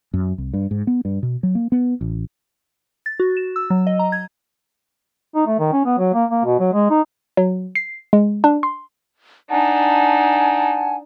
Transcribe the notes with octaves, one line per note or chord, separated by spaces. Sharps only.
F#2
C2
G2
G#2
B3
G2
B2
F#3
A#3
B3
A1
A6
F#4
E7
E6
F#3
D#5
A#5
G#6
D#4
A3
D#3
C#4
B3
F#3
A#3
A#3
B2
F#3
G#3
D#4
F#3
C7
G#3
D4
C6
D4 D#4 F#5 G#5 A5